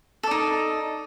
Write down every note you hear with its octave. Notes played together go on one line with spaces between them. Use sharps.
D#4 A4 D5